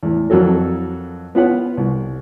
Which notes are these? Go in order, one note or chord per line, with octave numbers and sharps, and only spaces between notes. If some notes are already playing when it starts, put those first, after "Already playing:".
E2 A2
F2 F#3 A4 A#4
B3 F4 B4 C#5 F#5
C2